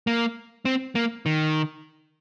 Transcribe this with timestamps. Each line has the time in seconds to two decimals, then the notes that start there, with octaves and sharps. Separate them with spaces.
0.07 A#3
0.65 C4
0.95 A#3
1.26 D#3